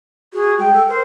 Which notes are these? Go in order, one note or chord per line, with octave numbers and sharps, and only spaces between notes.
F#4 G#4
G#3 G5
A4
A#4 C5